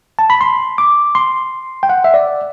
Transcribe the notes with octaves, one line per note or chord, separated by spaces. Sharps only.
A5
B5
C6
D6
C6
G5
F#5
E5
D5